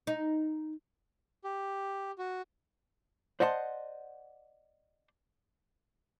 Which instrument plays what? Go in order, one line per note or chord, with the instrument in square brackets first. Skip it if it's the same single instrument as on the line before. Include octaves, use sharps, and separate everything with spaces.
[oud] D#4
[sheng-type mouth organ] G4
F#4
[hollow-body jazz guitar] C5 D5 D#5 F#5 A5 C6